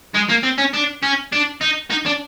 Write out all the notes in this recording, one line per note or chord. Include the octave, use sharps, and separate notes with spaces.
G#3
A#3
C4
C#4
D4
C#4
D4
D#4
D#4
D4